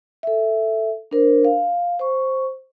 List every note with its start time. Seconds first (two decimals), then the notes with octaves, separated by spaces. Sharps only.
0.23 A4 E5
1.11 D4 A#4 C5
1.44 F5
1.99 C5 C#6